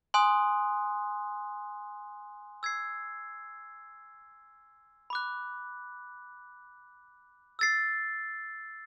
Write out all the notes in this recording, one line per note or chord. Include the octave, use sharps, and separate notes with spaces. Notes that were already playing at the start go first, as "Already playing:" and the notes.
G#5 C6 D#6 F#6
E6 G#6 C7
B5 D6 F#6
E6 A6 C7